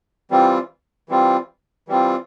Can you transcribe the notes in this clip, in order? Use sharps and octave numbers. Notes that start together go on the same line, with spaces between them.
E3 G3 C4 F4
E3 G3 C4 F4
E3 G3 C4 F4